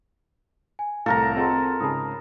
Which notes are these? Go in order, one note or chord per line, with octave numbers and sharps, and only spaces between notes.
G#5
C2 A2 A4 A#4 F5 A#5
C4 F4 G#4 D#5 F#5 C6
G#2 C#3 G#4 A5 B5 D#6